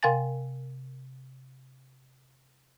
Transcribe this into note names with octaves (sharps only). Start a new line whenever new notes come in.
C3 A#4 F5 G5 G#5 A6